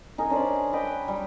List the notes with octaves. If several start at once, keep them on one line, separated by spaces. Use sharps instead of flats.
D#4 G#4 A#4
C#4 D4 C5 D5
B4 D#5 G5
G3